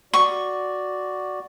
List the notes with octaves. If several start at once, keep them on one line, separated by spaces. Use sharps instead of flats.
F#4 D5 C#6